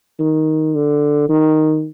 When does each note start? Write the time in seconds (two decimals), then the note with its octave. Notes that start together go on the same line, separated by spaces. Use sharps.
0.19 D#3
0.75 D3
1.29 D#3